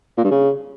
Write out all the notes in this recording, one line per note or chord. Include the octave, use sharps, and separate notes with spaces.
A#2
G2
C#3